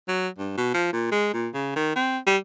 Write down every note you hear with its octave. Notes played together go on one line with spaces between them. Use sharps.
F#3
G2
B2
F3
A#2
G#3
A#2
C#3
D#3
C4
G3